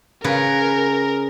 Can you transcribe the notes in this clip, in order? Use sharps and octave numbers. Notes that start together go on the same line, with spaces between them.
C#3 G#4 A#4 B4